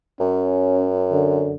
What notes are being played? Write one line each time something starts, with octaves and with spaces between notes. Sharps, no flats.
F#2 C#4
D3